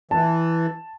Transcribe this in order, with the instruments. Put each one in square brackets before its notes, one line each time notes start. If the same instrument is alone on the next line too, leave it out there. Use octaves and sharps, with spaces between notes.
[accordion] E3 [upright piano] A5